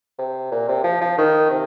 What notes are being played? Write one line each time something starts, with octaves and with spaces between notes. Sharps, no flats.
C3
A#2
C3
F3
F3
D#3
C3